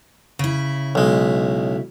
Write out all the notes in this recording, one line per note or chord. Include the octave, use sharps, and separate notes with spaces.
C#3 E4
B1 G#3